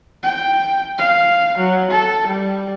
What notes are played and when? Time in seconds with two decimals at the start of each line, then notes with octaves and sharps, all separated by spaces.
0.23 G5
0.98 F5
1.58 F#3
1.91 A4
2.27 G3